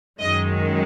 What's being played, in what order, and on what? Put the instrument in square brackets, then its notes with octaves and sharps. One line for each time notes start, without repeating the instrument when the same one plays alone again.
[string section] F#2 D#3 G#3 D#5